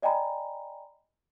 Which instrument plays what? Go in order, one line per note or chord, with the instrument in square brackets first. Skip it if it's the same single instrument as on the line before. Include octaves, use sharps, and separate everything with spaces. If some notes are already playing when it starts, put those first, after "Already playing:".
[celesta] D5 D#5 G5 G#5 A#5 B5